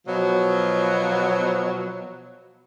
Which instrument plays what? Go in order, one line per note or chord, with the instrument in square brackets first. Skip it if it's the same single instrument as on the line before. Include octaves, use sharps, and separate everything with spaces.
[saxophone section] B2 F3 F#3